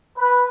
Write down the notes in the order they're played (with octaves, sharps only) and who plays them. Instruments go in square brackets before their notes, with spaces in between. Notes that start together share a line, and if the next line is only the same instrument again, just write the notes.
[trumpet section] B4